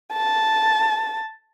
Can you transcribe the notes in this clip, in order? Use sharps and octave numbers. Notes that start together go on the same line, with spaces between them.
A5